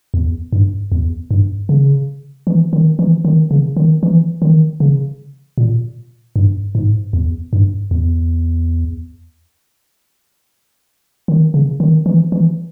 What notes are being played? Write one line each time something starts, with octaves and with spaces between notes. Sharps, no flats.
E2
G2
E2
G2
C#3
E3
D#3
E3
D#3
C#3
D#3
E3
D#3
C#3
A#2
G2
G#2
E2
G2
E2
D#3
C#3
D#3
E3
E3